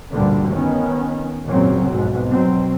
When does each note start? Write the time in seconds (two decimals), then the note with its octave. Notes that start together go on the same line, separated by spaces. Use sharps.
0.12 A1 D2 G2 A#2 D3 G3
0.50 D#3 B3 C#4
1.46 G#1 F#2 A#2 C#3 F#3 C4
1.90 B1 F2 G#2 B2
2.32 B2 F#3 C4